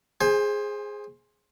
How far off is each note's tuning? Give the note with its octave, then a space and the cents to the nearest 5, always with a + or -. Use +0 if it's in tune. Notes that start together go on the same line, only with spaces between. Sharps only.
G#4 +0 C5 +15 G#5 -30